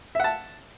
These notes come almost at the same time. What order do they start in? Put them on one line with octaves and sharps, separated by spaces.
E5 F#5 A5